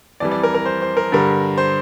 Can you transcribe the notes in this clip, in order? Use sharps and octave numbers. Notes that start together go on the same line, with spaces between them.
F2 E3 G3 D5
D5
A#4
A#4
C5
C5
A#4
G2 D3 G3 A#4
C5